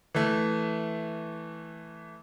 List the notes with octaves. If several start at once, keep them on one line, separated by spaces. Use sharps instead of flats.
E3 A3